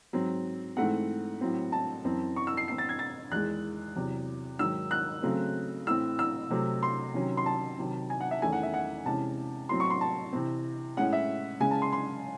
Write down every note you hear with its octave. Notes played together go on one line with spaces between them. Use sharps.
G#2 F#3 C4
G#2 E3 A3 C4 F#5
A2 F#3 C4
A5
F#2 E3 C4
C#6
E6
C7
A2 E3 C4 C7
A6
G#6
A6
E2 D#3 G#3 F#6
E2 C3 F#3
G#2 D#3 F#3 E6
F#6
C#3 F#3 A3 C4
A2 E3 C4 E6
E6
C3 F#3 A3 C4
C6
C3 D#3 F#3 C#4
C6
A5
C3 D#3 F#3
G#5
F#5
E5
E2 D#3 A3 C#4 G#5
F#5
E5
F#5
C3 E3 G#3 C#4 A5
A2 F#3 C4 C6
C#6
C6
A5
C3 E3 C4
A2 G#3 C#4 F#5
E5
C#3 G#3 C#4 G#5
A5
C6
C6